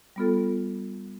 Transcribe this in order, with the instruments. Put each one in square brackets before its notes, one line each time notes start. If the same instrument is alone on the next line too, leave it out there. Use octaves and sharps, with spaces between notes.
[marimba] G3 B3 F4 A4